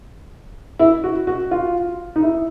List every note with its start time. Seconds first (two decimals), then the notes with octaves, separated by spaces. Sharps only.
0.79 E4
1.04 F#4
1.27 F#4
1.51 F4
2.16 D#4
2.22 E4